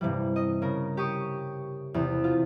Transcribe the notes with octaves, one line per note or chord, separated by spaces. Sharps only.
G2 C3 E3 G3
D#5
C#3 A#4
G4 C#6 D#6
E2 C3
F4